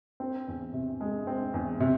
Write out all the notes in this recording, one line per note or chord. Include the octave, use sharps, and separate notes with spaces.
C4
E2
C3
G#3
C4
E2
C3